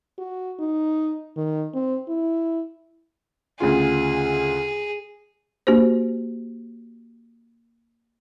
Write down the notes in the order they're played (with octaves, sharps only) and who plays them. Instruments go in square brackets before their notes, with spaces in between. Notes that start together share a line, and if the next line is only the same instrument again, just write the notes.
[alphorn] F#4
D#4
D#3
C4
E4
[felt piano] D2 C#3 F4 [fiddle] G#4
[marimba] A#3 D4 F#4 G4 C5